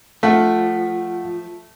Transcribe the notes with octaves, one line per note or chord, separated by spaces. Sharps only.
F3 A3 F5 F#5